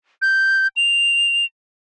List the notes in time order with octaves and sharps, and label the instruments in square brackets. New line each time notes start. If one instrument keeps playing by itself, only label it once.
[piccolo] G6
F7